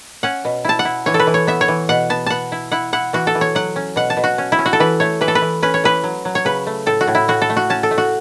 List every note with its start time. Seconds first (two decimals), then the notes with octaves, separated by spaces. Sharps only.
0.23 C#4 F#5
0.45 B2
0.65 E4 A5
0.79 F#5
0.85 E4
1.06 E3 C#5
1.14 A4
1.19 B4
1.27 E3
1.34 C#5
1.47 B3 E5
1.61 C#5
1.68 E3
1.89 B2 F#5
2.10 B3 A5
2.26 B3 F#5 A5
2.52 E4
2.72 E4 F#5
2.93 E4 F#5
3.13 E3 F#4
3.27 A4
3.35 E3
3.41 C#5
3.55 F#3 F#5
3.76 C#4
3.96 B2 F#5
4.10 A5
4.17 B2
4.24 F#4
4.38 C#4
4.52 E4
4.59 C#4
4.66 F#4
4.73 A4
4.80 E3 B4
5.00 A3 C#5
5.21 E3 B4
5.28 A4
5.35 B4
5.42 E3
5.63 C#4 B4
5.74 C#5
5.84 E3 B4
6.04 F#3
6.25 F#3
6.35 C#5
6.45 C#3 B4
6.67 A3
6.86 A2 A4
7.01 F#4
7.08 A2
7.15 E4
7.28 A2 F#4
7.42 A4
7.50 A3
7.57 F#4
7.70 C#4 A5
7.83 A4
7.91 A3
7.98 F#4